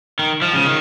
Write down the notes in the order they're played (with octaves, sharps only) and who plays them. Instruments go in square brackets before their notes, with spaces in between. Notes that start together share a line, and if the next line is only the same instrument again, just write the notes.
[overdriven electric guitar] D#3
F3
C#3
D#3